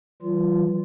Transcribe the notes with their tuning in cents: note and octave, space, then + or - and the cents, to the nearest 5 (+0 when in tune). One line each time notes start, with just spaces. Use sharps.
E3 +0 G3 -45 F4 -15